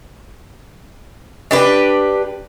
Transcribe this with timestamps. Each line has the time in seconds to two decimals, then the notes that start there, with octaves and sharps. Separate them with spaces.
1.51 D4 G4 B4